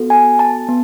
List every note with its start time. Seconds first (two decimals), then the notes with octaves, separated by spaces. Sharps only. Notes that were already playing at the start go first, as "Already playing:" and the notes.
Already playing: B3 F#4 A4
0.10 G#5
0.39 A5
0.68 B3